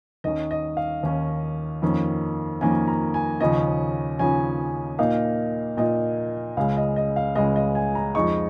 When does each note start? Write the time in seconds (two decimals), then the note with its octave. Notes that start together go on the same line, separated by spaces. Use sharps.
0.24 D#2 D#3 C#4 D#5
0.51 D#5
0.77 F5
1.03 D#2 D#3 C#4
1.82 F2 D#3 A#3 C#4
2.61 F2 D#3 A#3 C#4 G#5
2.88 A#5
3.14 G#5
3.40 D#2 C#3 F3 C#4 D#5
4.19 D#2 C#3 F3 C#4 G#5
4.99 A#2 A#3 D#4 F5
5.77 A#2 A#3 D#4 D#5
6.57 C#2 C#3 G#3 F5
6.77 D#5
6.96 D#5
7.16 F5
7.36 C#2 C#3 G#3 D#5
7.56 D#5
7.75 G#5
7.95 A#5
8.15 F2 F3 G#3 D#4 C#6